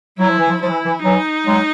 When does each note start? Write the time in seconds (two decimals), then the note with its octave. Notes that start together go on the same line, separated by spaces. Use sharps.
0.19 F#3 E4
0.29 F3
0.39 E3
0.49 F3
0.61 F3 E4
0.69 E3
0.86 E3
1.04 E3 F#3 D#4
1.46 F#3 G#3